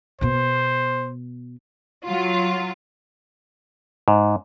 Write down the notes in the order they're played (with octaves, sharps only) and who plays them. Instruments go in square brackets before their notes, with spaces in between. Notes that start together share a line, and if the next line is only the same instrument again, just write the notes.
[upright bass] B2 B3 [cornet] C5
[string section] F#3 F4
[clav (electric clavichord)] G#2